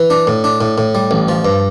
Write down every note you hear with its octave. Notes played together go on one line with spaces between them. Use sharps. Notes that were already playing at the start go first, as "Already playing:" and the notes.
Already playing: E3
D4
A2
D4
A2
A2
G3
A1
F3
G2